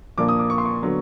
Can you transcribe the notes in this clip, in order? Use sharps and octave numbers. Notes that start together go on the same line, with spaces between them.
A#2 F3 A#3 D4 D6
D#6
D6
C#6
C6
C#6
D3 F#3 B3